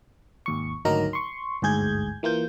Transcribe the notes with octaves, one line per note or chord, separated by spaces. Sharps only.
G#1 D#2 C#6
G#1 D2 F#3 D#4 A#4 A#5
C6 C#6
G1 D2 G#2 G#4 G6 G#6
E3 A#3 F4 G6